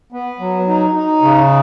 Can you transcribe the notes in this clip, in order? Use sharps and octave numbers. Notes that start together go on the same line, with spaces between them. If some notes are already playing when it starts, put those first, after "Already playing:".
B3
F#3
D#4
D#4
C#3